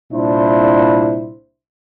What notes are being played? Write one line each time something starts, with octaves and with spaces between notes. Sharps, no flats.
C2 A#2 D4 E4 C5